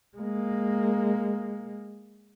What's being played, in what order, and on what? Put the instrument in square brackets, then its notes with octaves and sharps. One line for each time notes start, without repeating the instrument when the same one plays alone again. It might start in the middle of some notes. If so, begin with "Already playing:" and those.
[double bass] G#3 A#3